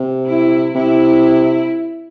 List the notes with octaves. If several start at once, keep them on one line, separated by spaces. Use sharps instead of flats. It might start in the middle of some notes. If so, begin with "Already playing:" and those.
Already playing: C3
E4
C3 E4